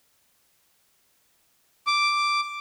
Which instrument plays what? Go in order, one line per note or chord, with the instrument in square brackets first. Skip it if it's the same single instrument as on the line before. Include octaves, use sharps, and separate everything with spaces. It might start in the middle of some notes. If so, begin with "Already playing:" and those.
[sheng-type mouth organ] D6